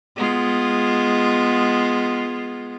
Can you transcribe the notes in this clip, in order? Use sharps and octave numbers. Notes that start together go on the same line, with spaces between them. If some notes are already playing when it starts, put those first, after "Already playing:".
G#3 B3 F4